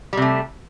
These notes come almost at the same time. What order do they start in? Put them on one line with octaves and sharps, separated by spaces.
G3 C3 A3